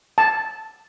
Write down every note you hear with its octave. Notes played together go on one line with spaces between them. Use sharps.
A5